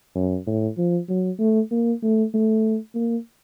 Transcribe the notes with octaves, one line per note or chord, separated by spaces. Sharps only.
F#2
A2
F3
F#3
A3
A#3
A3
A3
A#3